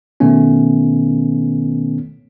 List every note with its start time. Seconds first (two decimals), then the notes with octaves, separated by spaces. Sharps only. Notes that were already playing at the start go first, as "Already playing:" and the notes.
0.20 B2 D#3 A3 B3 C#4